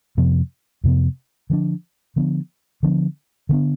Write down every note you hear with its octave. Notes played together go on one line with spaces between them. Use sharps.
F2 C3 F3 B3
F2 C3 F3 B3
D3 F3 B3 D4
D3 F3 B3 D4
D3 F3 B3 D4
D3 F3 B3 D4